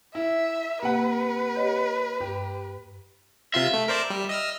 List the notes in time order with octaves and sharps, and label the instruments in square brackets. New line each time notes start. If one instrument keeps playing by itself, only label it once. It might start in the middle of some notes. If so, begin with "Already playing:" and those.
[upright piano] E4 [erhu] E5
[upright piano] C3 F#5 [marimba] A#3 [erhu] B4
[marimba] G4 C#5 D#5
[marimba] G2 [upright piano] G4
[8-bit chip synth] C3 F4 C6 [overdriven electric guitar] E5
[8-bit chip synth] A3
A#4 C5 D5
G3
D#5 E6 F6